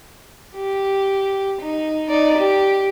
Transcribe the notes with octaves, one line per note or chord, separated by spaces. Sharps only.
G4
D#4
D#4 D5
G4